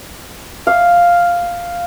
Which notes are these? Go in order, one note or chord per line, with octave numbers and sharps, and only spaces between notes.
F5